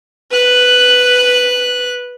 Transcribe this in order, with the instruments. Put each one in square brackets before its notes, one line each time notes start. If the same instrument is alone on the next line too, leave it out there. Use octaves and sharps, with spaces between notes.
[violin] B4 F#6